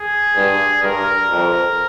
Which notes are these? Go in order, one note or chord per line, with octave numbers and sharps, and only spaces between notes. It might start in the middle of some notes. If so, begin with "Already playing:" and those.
Already playing: G#4
G2
G2 A#4
F2